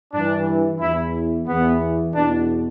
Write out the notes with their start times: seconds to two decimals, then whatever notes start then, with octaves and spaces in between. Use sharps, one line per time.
0.12 G2 E3 D4
0.80 E2 E3 E4
1.46 E2 E3 B3
2.14 E2 B2 D4